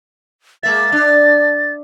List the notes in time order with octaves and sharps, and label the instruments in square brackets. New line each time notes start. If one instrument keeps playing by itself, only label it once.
[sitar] G#3 A#3 E5 [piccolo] A6
[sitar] D4